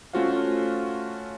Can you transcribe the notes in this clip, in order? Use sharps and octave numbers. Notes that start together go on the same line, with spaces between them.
A3 C#4 F4 F#4 C5 F5